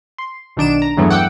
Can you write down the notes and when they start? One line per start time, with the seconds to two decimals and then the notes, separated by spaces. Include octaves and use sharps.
0.18 C6
0.57 B1 D#3 D4 D7 E7
0.82 A#5
0.97 E2 G2 E3 F#3 A3 B3
1.10 F#5 G5 D6 E6